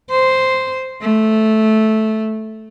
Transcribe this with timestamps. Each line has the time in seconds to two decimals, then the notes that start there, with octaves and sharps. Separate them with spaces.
0.10 C5
1.01 A3